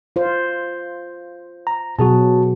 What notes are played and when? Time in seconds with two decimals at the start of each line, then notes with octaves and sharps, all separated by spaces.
0.16 F4 C5
1.67 A#5
1.99 B2 F#3 F#4 G#4 A5